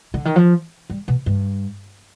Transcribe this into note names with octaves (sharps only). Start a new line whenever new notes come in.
D3
D#3
F3
G3
B2
G2